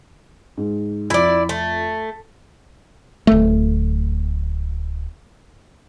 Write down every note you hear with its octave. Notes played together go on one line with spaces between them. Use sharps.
G#2
F2 E4 D5
A3
D1 A3